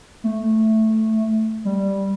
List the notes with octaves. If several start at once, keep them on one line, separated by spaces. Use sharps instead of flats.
A3
G3